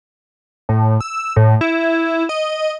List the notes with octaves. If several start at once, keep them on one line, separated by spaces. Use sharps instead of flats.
A2
E6
A2
E4
D#5